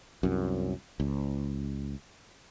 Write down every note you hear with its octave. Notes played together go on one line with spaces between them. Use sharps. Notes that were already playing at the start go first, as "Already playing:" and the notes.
C2 F#2
C#2